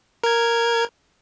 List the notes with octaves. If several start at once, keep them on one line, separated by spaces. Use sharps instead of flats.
A#4 G#6